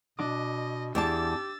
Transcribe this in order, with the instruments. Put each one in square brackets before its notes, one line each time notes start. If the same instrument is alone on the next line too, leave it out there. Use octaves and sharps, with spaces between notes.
[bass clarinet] B2 [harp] D4 D6 [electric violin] D#5
[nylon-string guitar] E2 D5 A5 [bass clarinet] G4 [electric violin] E6 A6